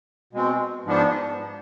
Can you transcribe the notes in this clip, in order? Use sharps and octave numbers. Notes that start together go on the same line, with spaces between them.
B2 G#3 C4
G#2 F3 B3 D4